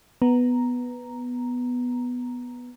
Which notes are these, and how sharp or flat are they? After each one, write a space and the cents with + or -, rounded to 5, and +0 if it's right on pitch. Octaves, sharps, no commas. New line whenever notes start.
B3 +0 A#5 +0